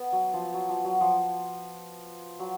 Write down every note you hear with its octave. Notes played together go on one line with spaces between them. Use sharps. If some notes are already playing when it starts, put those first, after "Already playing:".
Already playing: B3
F#3
F3
F#3
F3
F#3
F3
F#3